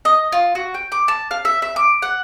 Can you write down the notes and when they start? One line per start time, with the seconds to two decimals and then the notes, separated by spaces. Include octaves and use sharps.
0.05 D#5
0.32 F4
0.55 F#4
0.74 G5
0.92 D6
1.08 A5
1.31 F5
1.45 E5
1.62 E5
1.76 D6
2.02 F#5